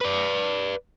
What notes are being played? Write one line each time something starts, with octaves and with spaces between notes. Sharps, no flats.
B4 D5